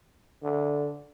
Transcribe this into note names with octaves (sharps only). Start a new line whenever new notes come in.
D3